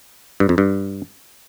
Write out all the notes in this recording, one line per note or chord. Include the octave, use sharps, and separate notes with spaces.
G2
F2
G2